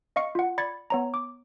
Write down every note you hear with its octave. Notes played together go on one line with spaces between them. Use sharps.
D#5 F5 C#6 C#7
F4 F#5
D5 B5 G#6 A6 C#7
B3 C#5 A#5
D6